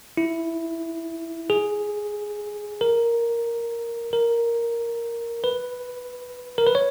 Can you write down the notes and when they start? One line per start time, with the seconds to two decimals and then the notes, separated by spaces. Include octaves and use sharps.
0.17 E4
1.50 G#4
2.81 A#4
4.13 A#4
5.44 B4
6.58 A#4
6.67 B4
6.75 C#5